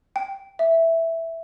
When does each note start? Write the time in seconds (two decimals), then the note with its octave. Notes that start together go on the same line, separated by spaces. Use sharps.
0.16 G5
0.59 E5